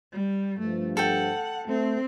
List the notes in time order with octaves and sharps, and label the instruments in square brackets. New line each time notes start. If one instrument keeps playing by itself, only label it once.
[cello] G3
[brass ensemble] G2 F3 [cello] A3
[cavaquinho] A4 G5 [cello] F#5
[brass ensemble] A3 [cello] C4